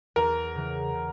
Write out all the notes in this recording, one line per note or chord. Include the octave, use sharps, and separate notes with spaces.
E2 A#4
C#3 E3
C#3